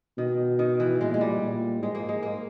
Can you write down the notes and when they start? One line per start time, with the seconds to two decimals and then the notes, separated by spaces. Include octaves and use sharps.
0.18 B2 D#3
0.59 D#3
0.80 E3
1.00 A#2 G#3
1.14 G#3
1.21 G3
1.41 A#2
1.82 G#2 G#3
1.95 A#3
2.09 G#3
2.23 A#3